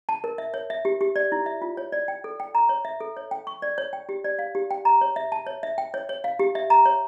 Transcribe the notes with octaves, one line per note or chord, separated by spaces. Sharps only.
A5
A#4
E5
C#5
E5
G4
G4
D5
E4
E5
F4
C#5
D5
G5
A4
G5
A#5
C#5
E5
A4
C#5
G5
C#6
D5
C#5
G5
G4
D5
F5
G4
G5
A#5
C#5
E5
A5
C#5
E5
G5
C#5
C#5
F5
G4
E5
A#5
C#5